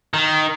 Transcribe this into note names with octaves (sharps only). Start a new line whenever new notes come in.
D#3